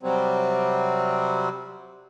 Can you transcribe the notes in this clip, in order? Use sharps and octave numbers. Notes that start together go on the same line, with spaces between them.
C3 F#3 G3 C4